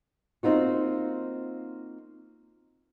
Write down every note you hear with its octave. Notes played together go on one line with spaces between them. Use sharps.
A#3 C4 D#4 F4 F#4